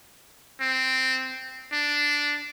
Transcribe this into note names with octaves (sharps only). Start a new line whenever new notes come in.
C4
D4